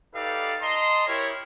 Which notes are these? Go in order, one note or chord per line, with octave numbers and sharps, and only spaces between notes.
D#4 G4 A4 B4 D5 F5
D#5 A5 A#5 C6
E4 G4 A#4 C#5